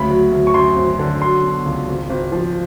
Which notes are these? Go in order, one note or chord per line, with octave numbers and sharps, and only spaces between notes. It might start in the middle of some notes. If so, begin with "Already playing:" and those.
Already playing: D2 C#3 B5
F#3
D2
C#6
F#2 C6
G#1
D3
F#3 C6
B2
C#2
G#1
G#1
F3